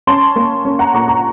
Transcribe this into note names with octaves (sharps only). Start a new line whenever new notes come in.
C#4 A5 C6
A#3
C#4
F#5 A#5
A#2 A#5 C#6
A#5 C#6